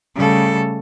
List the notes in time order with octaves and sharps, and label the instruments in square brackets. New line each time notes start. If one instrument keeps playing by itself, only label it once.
[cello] C#3 A4 [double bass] G3 A3